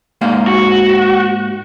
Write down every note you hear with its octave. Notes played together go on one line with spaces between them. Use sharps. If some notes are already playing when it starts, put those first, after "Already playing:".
G#2 A#3 F5
F#4